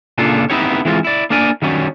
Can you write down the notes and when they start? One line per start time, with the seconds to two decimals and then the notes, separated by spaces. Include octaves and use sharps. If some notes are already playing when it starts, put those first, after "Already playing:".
0.18 A#2 C#3 A#3 D4 F4 A4
0.50 B3 C4 D#4 E4 G4 C#5
0.85 E3 G#3 C4 D4 F4
1.04 E4 D5
1.30 A#3 D4 A#4 D5 G#5
1.62 D#3 F#3 G3 C#4